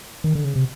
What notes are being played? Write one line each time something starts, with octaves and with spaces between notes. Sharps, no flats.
D#3
D3
C#3
C3